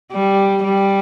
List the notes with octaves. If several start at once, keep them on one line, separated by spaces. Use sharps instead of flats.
G3
G3